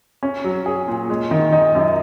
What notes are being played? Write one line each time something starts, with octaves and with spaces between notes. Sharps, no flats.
C#4
F#3
G#4
A#2
G#3
D#3
D#4
F#2